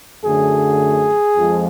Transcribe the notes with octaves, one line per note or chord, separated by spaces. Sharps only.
F#2 D3 F#3 A3 G#4
F2 F3 G#3